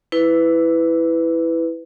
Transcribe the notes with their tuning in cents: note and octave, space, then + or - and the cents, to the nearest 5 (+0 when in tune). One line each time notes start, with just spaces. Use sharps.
E4 +0 B4 +15